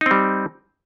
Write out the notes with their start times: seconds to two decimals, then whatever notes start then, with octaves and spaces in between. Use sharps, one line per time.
0.01 D#4
0.06 C4
0.11 G3